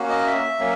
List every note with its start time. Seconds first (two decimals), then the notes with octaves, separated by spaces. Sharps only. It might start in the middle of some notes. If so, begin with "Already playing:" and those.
Already playing: A#3 C#4 F#4
0.09 D#5
0.26 E5
0.59 F#3 A#3 C#4